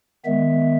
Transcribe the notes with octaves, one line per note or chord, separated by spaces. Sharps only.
D#3 G#3 B3 E5